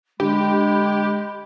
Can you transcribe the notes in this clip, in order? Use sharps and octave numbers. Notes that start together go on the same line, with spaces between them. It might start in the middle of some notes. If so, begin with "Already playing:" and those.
D3 G#3 G4 B5